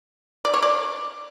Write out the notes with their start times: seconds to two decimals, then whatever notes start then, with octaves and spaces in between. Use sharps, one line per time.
0.45 D5
0.54 C#5
0.63 D5